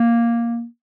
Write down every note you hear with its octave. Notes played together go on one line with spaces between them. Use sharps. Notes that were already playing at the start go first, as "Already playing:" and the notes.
Already playing: A#3